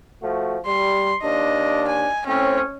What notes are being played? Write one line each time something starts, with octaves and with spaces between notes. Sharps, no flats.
F3 A3 F#4
G3 C6
D#2 D4 D#5
G#5
A2 C4 C#4